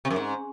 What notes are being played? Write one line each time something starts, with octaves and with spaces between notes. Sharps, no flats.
C3
F#2
G#2